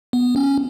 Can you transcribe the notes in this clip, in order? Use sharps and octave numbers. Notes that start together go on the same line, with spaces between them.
B3
C#4